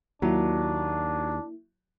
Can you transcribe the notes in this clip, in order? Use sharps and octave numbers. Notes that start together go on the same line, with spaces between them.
D#2 F#3 A#3 D4 E4